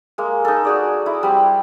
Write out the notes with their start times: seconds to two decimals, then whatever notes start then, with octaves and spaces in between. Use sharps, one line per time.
0.18 G#3 A#3
0.45 D#4 A4
0.65 F#4 G#4 D5
1.06 E4
1.23 G3 C4